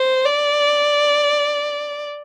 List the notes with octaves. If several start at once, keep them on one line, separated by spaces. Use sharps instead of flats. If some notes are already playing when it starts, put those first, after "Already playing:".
Already playing: C5
D5